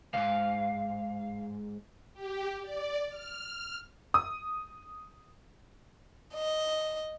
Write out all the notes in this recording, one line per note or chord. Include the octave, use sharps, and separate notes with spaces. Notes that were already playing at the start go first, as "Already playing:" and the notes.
C#2 G#2 F5
G4
D5
F6
D#6
D#5